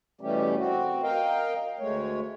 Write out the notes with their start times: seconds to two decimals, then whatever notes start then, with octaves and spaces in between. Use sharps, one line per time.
0.21 B2 E3 G3 A3 C#4 G4
0.58 C4 F#4
1.03 A#4 D#5 F5 G5
1.79 D2 G#3 A3 C#5